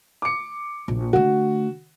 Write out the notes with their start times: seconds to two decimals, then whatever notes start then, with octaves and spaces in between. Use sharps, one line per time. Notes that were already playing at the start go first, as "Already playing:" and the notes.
0.22 D6 C#7
0.88 A#1
1.13 D3 A3 F#4